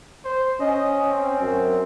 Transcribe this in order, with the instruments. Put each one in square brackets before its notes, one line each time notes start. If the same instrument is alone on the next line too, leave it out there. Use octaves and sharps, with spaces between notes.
[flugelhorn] C5
[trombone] C#4 [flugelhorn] D#5
[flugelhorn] C4
[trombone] F#2